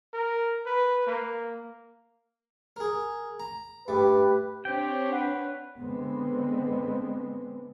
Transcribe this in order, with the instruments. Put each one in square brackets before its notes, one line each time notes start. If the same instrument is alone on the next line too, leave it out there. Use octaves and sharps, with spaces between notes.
[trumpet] A#4
B4
A#3
[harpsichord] G#4 A#4
A#5
[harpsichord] G2 A3 [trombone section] G4 B4
[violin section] C4 D4 C#5 [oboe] G4 [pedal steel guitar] G5
[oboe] B4 [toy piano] F#5
[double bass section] D3 G#3 B3 C4